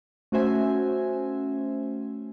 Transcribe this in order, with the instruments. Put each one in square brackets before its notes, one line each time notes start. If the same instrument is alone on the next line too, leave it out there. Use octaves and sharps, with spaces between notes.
[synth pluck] A3 C#4 F#4 C5 E5 G#5